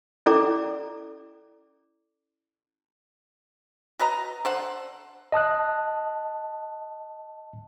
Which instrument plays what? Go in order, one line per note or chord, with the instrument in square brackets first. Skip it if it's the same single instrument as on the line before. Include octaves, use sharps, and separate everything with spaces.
[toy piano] C#4 E4 A4 D5 A#5 D6
[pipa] F#4 B4 D#5 A#5
D3 C5 F#5
[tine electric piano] D#5 A5 D#6 F#6